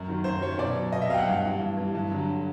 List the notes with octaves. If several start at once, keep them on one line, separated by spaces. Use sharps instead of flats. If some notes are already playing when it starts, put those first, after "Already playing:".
Already playing: F#2
D#3 F#3
F#2 C5
D#3 F#3 C#5
B2 D5
F#3
B2 D#5
E5
F#3 F5 G5
F#5
G2 F5
E3 G3
G2
E3 G3
G2
D3 F#3